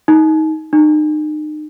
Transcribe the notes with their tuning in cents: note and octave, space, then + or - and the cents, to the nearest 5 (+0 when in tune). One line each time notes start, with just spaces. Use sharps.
D#4 +20
D#4 -35